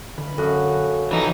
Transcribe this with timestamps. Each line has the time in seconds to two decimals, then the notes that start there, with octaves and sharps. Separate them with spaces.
0.18 D3 F5 B5
0.38 F#2 F#4 A4 F5
1.11 E3 F3 D#4 A4